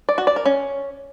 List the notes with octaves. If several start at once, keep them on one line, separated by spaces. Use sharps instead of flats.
D5
F#4
D5
A#4
C#4